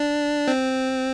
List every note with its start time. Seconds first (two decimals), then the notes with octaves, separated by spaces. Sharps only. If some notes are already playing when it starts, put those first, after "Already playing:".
Already playing: D4
0.48 C4